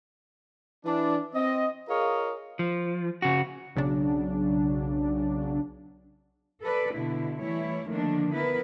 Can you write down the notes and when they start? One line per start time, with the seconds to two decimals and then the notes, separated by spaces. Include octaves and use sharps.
0.85 E3 D4
1.34 C4 D#5
1.89 F4 G#4 A#4 C#5 D#5 F5
2.59 F3
3.22 C#3 F#4
3.76 B1 C#3 F#3 D4
6.62 A4 B4 D5
6.93 B2 D3 E4
7.39 E3 G3 A3 E4 C#5
7.88 D3 D#3 F3 A3 A#3 D4
8.32 B3 E4 A#4 B4